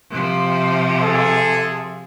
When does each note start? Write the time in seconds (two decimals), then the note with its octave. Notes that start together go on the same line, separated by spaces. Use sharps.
0.11 C3 F3
1.02 G#4 A4